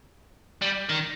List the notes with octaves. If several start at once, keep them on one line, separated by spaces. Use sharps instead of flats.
G3
D#3